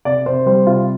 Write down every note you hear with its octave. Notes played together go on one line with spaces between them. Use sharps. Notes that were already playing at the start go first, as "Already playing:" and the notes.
C3 D5
C3 C5
G3 C5
C3 F4